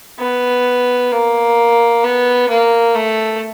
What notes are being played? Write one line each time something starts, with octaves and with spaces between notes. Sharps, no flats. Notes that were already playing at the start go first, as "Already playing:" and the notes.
B3
A#3
B3
A#3
A3